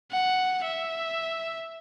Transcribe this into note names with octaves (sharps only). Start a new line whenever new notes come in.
F#5
E5